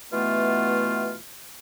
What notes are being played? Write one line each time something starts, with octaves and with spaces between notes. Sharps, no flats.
B2 E3 A3 B3 F4